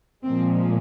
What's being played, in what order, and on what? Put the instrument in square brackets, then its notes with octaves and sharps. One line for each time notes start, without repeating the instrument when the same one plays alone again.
[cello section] A#2 F3 G#3 C4